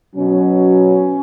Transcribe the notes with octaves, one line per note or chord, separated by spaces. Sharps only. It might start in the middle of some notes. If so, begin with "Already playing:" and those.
B2 F#3 C#4